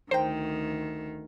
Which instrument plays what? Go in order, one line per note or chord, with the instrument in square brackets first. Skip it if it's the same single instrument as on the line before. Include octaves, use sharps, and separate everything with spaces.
[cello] D2 D#3 [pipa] A#4 G5 [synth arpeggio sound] C5